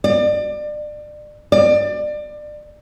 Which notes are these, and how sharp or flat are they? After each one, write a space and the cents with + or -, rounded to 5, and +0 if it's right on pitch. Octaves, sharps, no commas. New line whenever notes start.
D5 +30
D5 +25